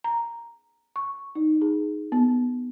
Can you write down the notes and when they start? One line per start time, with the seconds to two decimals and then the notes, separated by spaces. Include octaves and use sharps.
0.04 A#5
0.96 C#6
1.35 D#4
1.61 G#4
2.12 B3